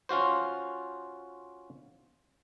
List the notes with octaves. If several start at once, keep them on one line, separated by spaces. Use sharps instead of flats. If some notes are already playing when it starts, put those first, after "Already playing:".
C#4 F4 F#4 C5